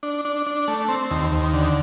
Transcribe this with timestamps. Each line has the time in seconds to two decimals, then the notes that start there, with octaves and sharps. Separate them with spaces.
0.03 D4
0.25 D4
0.46 D4
0.68 A3
0.88 C4
1.11 D#2
1.32 D#2
1.54 D3